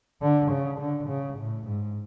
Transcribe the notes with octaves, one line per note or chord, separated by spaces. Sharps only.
D3
C#3
D3
C#3
A2
G#2